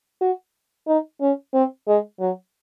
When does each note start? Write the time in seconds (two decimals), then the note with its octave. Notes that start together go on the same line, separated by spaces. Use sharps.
0.21 F#4
0.87 D#4
1.21 C#4
1.54 C4
1.88 G#3
2.20 F#3